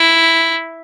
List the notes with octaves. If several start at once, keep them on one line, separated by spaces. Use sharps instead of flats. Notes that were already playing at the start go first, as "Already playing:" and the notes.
Already playing: E4